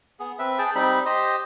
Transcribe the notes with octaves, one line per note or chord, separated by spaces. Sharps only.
B3 G#4
C4 B4 E5
G#4 G5 A5
G3 C4 D#4 B5
G4 C5 D#5